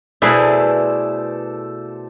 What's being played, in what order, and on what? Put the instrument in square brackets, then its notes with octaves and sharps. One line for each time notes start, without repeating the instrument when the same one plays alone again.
[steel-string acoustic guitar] B2 A3 [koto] E4 G#4 B4 [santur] A4 C5 D5